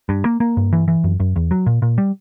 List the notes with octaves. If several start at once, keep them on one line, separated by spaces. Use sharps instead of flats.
G2
A#3
A#3
G2
E3
E3
F#2
F#2
E2
F#3
A#2
A#2
G3